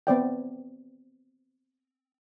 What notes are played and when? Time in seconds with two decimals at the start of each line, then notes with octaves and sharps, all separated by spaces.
0.07 B3 C4 C5 D5 E5 G5